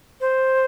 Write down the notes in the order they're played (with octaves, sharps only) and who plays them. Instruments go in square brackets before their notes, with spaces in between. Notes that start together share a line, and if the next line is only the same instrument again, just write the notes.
[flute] C5